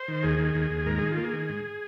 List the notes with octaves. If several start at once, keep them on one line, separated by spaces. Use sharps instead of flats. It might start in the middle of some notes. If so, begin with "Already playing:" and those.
Already playing: C5
D#3
D#2 G#4
D#3
D#2
D#2
G#2 A#4
D#3 G#4
F4
A#3
G#4
D#3
G#2